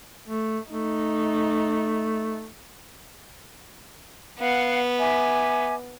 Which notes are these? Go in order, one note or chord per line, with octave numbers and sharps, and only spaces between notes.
A3
A3 D#4
B3 F5 F#5
E5 G#5 D6